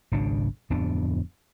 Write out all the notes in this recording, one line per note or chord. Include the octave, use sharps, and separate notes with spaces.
G#1 C#2 B2 D4
D1 F2 B3 D4